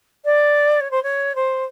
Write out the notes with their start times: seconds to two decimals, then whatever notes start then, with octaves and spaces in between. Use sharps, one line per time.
0.25 D5
0.81 C#5
0.91 C5
1.03 C#5
1.35 C5